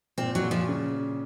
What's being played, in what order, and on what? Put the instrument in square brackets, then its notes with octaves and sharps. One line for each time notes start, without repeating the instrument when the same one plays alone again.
[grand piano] A#2 [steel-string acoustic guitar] C4
[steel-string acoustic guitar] F#3
[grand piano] A#2
[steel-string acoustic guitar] F3
[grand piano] C#3